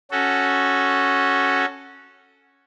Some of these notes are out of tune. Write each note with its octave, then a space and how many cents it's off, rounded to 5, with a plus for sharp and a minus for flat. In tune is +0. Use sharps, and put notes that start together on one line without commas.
C#4 +0 F#4 +0 A4 -5